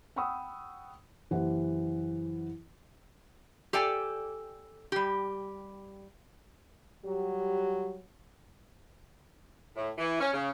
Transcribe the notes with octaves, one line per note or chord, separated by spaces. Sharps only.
F#5 G5 B5 C#6 D#6 E6
F#1 E3 G4 C5 F#5
G4 A4 D5 G5 G#5
G3 G4
F#3 G3 G4
A2
E3
C#4
C#3